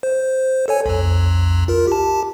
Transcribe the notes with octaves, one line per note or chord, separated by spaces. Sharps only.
C5
A4 C#5 G#5
B1 F2
F4 A#4
G4 A5